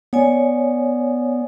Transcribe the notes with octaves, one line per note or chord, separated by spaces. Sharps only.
B3 C#5 D5 G#5